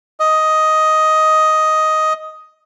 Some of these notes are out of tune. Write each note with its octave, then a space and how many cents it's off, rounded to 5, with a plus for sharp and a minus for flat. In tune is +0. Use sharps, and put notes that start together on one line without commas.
D#5 +10